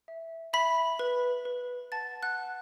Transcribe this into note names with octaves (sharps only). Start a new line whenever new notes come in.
E5
E5 B5 B6
B4
B4
F#5 A5 A6
F#5 F#6
F#5